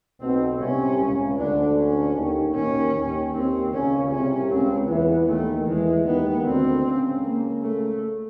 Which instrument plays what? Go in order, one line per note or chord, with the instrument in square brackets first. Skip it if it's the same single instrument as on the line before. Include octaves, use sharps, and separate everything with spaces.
[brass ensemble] B1 B2 [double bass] C4
[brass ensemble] C2 C3 [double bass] C#4
[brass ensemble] C#2 C#3
[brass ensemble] D2 D3 [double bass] D4
[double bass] C#4
[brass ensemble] D#2 D#3
[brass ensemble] D#2 D#3 [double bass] C#4
[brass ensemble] D#2 D#3
[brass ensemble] D#2 D#3 [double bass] C4
[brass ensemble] C#2 C#3 [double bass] C#4
[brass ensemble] C2 C3 [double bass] C#4
[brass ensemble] C#2 C#3 [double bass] C4
[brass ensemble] E2 E3 [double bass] B3
[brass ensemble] D#2 D#3 [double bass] A3
[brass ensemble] E2 E3 [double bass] G#3
[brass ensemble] D#2 D#3 [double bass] B3
[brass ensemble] D2 D3 [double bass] C4
[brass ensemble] C#2 C#3
[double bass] A#3
A3